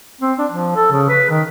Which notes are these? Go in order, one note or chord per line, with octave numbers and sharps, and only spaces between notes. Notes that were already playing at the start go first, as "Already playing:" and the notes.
C4
D4
F3
A4
C#3
B4
D#3